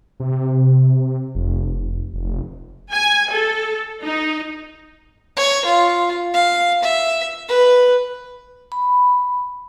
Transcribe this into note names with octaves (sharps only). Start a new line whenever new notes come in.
C3
F1
F1
G#5
A4
D#4
C#5
F4
F5
E5
B4
B5